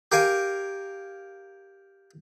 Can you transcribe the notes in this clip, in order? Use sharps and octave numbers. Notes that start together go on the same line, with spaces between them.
G4 A#4 F5 G#5